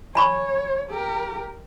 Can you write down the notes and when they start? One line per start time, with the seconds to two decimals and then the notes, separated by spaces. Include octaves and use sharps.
0.15 C#5 G#5 B5 C#6
0.90 G4 A#4